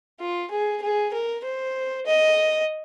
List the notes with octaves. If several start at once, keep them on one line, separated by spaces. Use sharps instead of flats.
F4
G#4
G#4
A#4
C5
D#5